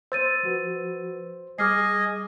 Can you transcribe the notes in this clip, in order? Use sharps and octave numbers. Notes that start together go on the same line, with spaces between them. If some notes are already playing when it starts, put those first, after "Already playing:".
C5 E6 A6 D#7
F3 F#4 B4
G3 G#4 D#5 G#5 D6 F6 C7